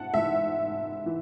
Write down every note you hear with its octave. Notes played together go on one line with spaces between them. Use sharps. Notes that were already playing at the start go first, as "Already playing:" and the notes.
Already playing: G#2 F#5 A5
G#2 E3 E5
E3